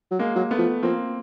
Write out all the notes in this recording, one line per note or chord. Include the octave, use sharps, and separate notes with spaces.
F#3
G#3 A#3
F#3
A3 B3
F3
F3 A#3 C4